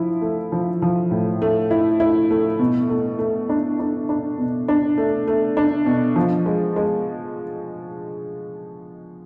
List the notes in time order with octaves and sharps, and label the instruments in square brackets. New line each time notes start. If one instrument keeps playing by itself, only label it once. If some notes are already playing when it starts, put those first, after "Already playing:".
Already playing: [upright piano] F3 E4
A3
F3
F3
A2
A3
E4
E4
A3
B2
A3
A3
D4
D4
D4
B2
D4
A3
A3
D4
B2
F3
G#3
G#3